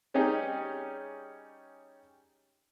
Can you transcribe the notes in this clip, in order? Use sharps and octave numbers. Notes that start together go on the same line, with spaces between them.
G3 C#4 D#4 G4 G#4